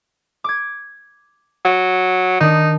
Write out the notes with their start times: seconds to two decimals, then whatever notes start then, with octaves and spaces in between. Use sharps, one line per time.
0.44 D6 G#6
1.65 F#3
2.40 D#3 D4 D#4